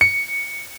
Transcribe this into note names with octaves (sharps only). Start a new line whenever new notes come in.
C#7